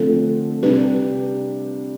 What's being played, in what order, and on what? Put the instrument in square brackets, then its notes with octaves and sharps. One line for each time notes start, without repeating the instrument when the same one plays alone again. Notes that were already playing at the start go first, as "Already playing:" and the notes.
Already playing: [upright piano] D3 F3 A3 C4 [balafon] A4
[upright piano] C3 G3 D4 G4 [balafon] B4